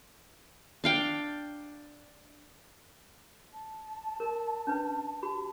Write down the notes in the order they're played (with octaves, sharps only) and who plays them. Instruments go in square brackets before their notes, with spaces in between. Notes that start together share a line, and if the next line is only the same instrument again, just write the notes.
[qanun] D4 F5 G5
[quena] A5
[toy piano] A#4
C#4 D4 B4
F#4 G4 B5